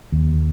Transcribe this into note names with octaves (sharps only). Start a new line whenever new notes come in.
D#2